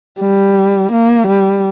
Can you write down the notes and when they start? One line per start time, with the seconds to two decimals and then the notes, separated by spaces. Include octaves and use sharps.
0.20 G3
0.92 A#3
1.27 G3